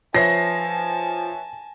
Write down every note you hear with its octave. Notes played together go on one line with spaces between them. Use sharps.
F3 B4 C#5 E5 G#5 A5 A#6 C7